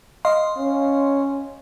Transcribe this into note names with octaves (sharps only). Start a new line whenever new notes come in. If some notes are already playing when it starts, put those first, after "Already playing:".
D#5 F5 C6
C#4